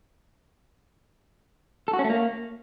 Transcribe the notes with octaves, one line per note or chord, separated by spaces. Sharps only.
A4
F#4
C#4
A3
A#3